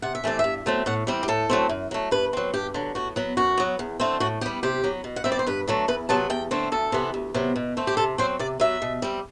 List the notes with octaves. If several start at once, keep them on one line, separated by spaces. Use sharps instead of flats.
C3 F#5
E5
E3 A3 C4 D5
G2 E5
F#3 A3 C4
A2 F#5
E3 G3 C4
G4
A2 A4
F#3 A3 C4
F#2
F#3 A3
G2 B4
F#3 C4
G2 G4
D3 F#3
A2 F#4
F#3 B3
F#2 F#4
F#3 B3
E2
D3 A3 C4
A2 F#4
G3 B3 G4
C3 G4
F#3 B3
B2
F#5
G3 C4 E5
D5
C5
G2 B4
D3 F#3 A3
E2 B4
C3 F#3 B3 A5
E2 G5
D3 A3 C4
D2 A4
C3 E3 B3
D2
C3 F#3 B3
B2
A3 C4
G4
C3 A4
F#3 C4 C5
C3 D5
F#3 B3 E5
B2
G3 C4